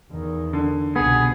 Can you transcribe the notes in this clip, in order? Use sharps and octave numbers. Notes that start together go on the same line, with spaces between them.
E2 D#3
D3
C2 B2 B3 G#4